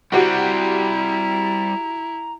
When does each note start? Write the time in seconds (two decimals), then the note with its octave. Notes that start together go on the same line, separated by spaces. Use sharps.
0.12 G3 C4 E4 F#4 G4 A#5